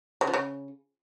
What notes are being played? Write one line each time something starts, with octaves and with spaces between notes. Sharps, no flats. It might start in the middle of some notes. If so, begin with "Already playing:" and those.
C#3
F3
C#3